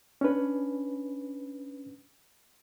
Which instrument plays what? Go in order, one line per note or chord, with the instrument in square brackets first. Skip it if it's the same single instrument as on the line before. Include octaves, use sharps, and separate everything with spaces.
[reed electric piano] C#4 D4 B4